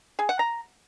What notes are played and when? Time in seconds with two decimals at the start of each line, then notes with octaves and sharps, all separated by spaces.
0.19 G#4
0.29 F#5
0.39 A#5